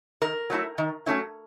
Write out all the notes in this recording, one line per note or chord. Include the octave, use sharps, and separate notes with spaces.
D#3 A#4
F#3 A3 C#4 E4
D#3
F#3 A3 C#4 E4